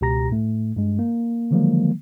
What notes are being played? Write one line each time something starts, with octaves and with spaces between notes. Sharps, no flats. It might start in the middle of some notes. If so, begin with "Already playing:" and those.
C#2 B2 G4 A#5 A#6
A2 A3
G2 G#3
A#3
D3 D#3 F3 F#3 G#3 A#3